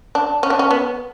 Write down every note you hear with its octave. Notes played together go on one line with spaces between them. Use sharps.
D4
C#4
D4
C#4
B3